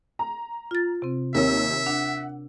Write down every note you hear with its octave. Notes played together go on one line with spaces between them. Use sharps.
A#5
F4 A6
C3 C4
D#2 C3 A#4 C#5 E5 E6
D4 F#5